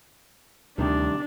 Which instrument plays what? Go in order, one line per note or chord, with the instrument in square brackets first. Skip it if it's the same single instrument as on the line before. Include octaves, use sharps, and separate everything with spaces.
[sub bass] D2 [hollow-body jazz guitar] C3 D#3 G3 [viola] D4